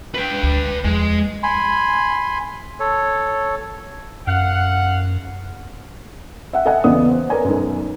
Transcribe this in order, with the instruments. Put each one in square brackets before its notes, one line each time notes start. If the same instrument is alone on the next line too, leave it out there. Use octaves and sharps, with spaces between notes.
[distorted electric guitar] B4 G5
[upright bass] D2
[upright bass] E2 F3 [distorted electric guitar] G#3
[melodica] G#5 B5 C6
A4 C#5
[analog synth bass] F#2 [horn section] F5 F#5
[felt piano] E5 F#5
A4 D#5 E5 F#5 G#5
E2 C#3 B3 D5 D#6
C5
A#4 B4 C#5 D5 G#5 A#5
B1 F#2